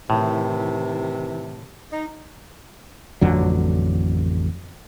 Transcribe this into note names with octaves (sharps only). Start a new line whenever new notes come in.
A2 C3 D#3 E3
D#4
A1 F2 D3 F#3